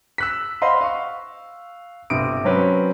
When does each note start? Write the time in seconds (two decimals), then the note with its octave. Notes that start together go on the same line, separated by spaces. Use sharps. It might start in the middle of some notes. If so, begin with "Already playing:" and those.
0.18 E6 F#6 B6
0.62 C5 D#5 F5 F#5 B5 C6
0.81 F5 C#6
2.10 G1 C3 D#6 D7
2.45 F#3 C4 C#4 B4